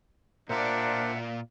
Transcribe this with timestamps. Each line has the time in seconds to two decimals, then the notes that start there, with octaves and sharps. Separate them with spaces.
0.49 A#2 D4 F4 A#4 C5 D5 E5 F#5